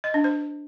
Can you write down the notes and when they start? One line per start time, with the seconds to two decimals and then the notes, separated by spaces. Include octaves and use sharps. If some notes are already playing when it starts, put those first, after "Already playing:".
0.04 D#5
0.14 D4
0.24 C5